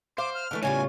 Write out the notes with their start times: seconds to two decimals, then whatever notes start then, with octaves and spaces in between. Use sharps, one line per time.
0.18 C5 F5 D6
0.34 F6
0.51 D3 E3 A3
0.63 A2 C#3 G3 F4 C#5 G#5